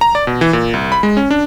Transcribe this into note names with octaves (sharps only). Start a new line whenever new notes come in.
A#5
D5
B2
E3
A#2
C2
B5
G#3
C#4
D4